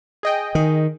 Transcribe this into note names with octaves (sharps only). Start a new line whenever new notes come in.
G#4 D#5 G5
D#3